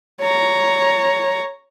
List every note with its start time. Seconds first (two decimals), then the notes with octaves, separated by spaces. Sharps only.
0.21 C#5 A#5